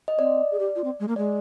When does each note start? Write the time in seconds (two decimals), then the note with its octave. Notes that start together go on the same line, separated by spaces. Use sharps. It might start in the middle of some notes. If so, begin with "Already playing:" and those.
0.08 D#5
0.19 C4 D5
0.51 G#4
0.59 G4
0.75 F4
0.84 C4
1.00 G#3
1.08 A#3
1.16 G#3 D5